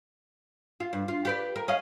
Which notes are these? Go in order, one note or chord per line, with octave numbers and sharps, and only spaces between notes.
F4
G2
F4
G4 B4 D5
A#4
C#4 D#5 F5